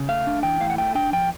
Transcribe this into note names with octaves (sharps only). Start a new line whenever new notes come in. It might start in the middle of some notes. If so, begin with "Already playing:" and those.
Already playing: C#3
A3 F5
D4
E3 G5
A2 F5
F#5
A3 G5
D4 G5
F3 G5